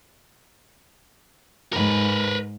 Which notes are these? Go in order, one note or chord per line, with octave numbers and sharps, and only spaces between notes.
G#2 A#4 B4